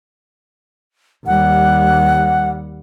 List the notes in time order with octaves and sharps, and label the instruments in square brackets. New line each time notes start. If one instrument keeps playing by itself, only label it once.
[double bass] D#2 G3 [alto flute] F#5